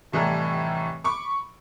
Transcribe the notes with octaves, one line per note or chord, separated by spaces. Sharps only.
F1 A2 E3 G3 A4 A#5
B5 C#6 D6